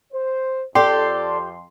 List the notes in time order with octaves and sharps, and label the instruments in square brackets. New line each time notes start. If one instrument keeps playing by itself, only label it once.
[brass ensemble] C5
[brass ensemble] F2 [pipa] G4 [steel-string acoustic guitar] A4 D5 [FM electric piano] C6